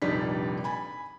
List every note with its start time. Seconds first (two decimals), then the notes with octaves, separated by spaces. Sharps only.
0.02 F1 A#1 G3 D4 D#4 B6
0.64 G#5 B5